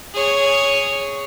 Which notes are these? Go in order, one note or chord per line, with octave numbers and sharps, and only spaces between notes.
G#4 C#5